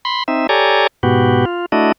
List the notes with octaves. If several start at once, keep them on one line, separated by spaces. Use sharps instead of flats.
B5 C6
C4 D#4 E5
G4 A4 C#5 D5 G#5 A#5
G#2 B2 B3 F#4 G4
F4
A3 D4 E4 F#4 D#5